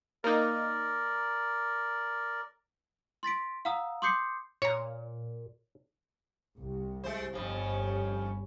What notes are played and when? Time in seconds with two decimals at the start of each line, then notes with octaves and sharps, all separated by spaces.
0.24 A#3 D#4 A#4 D5
3.23 C6 A6 B6 D7
3.65 F5 F#5 A#5 D#6 E6
4.02 C6 D6 D#6 G6 C7 C#7
4.62 A#2 C#5 A#5
6.56 C2
7.04 G#3 A3 C5
7.33 G1 F2 G#2 F3 G3 C#4